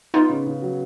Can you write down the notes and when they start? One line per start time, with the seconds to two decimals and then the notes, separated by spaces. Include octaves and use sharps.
0.14 B3 D#4 F4
0.29 C#3
0.47 C#3
0.62 F#3